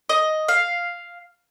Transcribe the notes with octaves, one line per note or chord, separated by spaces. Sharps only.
D#5
F5